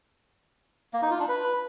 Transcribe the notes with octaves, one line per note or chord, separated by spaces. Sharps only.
A#3
D#4
F4
D4
B4